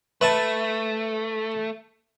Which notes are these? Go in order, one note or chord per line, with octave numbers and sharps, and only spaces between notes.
A3 B4 E5 A5